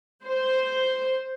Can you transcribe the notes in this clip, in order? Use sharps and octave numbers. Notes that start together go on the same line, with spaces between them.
C5